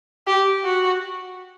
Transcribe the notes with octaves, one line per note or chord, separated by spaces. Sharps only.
G4
F#4